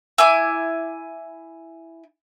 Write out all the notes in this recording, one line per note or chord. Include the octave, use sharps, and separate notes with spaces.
E4 G#5 D6